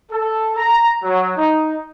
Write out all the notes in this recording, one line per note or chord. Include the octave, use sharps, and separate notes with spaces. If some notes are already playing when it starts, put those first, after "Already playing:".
A4
A#5
F#3
D#4